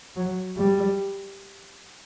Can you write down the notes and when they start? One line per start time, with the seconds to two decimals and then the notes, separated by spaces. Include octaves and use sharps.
0.16 F#3
0.57 G3